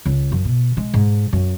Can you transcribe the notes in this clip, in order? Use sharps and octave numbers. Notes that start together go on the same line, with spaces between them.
C#2
F#2
B2
G#3
G#2
F#2